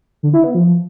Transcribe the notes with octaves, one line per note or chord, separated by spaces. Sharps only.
D3
E4
B3
F3